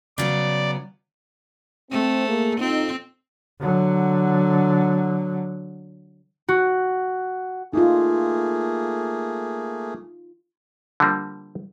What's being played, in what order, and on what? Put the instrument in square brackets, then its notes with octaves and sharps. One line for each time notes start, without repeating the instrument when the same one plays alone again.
[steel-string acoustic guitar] C#3 F#3 B3 [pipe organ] D5
[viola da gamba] A3 [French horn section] C4
[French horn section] A#3 G#4
[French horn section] F2 D#4 [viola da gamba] C4
[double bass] D3 F#3
[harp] F#4
[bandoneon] A3 A#3 G#4 [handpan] D#4 F4
[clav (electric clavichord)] D3 F3 G3 A#3